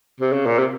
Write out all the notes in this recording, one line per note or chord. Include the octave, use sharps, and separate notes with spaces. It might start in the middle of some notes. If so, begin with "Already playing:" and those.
C3
C#3
A#2
C3